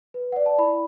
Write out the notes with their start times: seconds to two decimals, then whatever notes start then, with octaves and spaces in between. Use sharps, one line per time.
0.14 B4
0.32 D5 F#5
0.46 A5
0.58 E4 B5